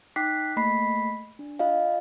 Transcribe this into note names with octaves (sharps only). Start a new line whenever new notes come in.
D#4 G5 D6 F#6 B6 C7
A3 A#3 D#5 B5 B6 C7
D4
F4 D#5 F5